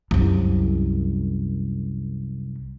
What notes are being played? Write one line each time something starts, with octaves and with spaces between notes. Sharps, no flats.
C2 F#2